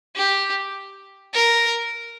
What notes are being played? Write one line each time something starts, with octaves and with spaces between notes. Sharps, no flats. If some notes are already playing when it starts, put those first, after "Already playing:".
G4
A#4